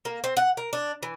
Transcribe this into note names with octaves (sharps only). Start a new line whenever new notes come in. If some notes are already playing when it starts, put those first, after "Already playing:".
A#3
C4
F#5
A#4
D4
E3